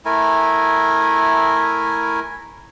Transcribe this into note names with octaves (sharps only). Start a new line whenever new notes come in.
A3 E4 A#4 G#5